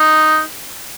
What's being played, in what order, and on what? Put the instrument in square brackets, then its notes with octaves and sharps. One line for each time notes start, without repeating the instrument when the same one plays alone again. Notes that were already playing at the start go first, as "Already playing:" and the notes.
Already playing: [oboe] D#4